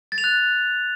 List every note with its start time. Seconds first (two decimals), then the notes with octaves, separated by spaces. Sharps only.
0.12 A6
0.18 F7
0.24 F#6